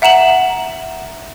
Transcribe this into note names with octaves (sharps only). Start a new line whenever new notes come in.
E5 F#5 A#5 E7 F#7